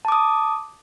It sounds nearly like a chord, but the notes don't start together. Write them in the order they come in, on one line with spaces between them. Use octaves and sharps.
A5 D6 D#6